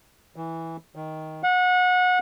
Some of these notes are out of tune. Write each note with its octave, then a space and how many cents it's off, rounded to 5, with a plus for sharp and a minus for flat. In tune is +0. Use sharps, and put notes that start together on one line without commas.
E3 -10
D#3 +10
F#5 -25